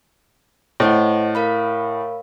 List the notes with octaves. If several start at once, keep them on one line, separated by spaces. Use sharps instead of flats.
A2 C5 D#5 F#5
A#4 F5 B5